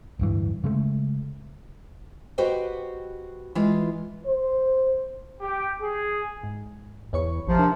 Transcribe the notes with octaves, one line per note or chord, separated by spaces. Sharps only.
D1 G2 E3
C#3 G#3 A3
F#4 G4 B4 C5 D#5 G5
E3 G#3 F4
C5
G4
G#4
G#2
E2 B4 C#5 C#6
A1 C3 F3
D4 A#4 E5